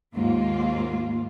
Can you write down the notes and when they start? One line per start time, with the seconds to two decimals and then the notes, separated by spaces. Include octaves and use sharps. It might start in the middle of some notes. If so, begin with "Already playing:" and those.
0.13 D#2 G#2 A#3 F4